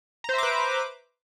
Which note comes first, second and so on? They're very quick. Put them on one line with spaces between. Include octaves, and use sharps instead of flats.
A#5 C5 E5 D6 B4